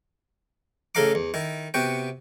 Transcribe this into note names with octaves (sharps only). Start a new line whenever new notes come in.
A1 C#3 A4 F5 A#5 D6
E2
D#3 E4
C3 B3 F#4 G5